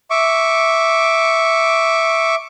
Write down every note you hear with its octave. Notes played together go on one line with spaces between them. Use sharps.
E5 C#6 D6